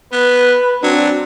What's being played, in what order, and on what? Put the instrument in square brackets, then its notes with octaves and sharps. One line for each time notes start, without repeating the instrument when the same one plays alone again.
[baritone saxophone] B3 [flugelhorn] B4
[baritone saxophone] F#3 [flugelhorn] C4 [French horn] D4